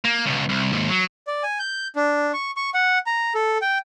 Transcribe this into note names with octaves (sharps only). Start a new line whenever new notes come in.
A#3
C#2 B2
C2
D#2 G#2
F#3
D5
G#5
G6
D4
C#6
C#6
F#5
A#5
A4
G5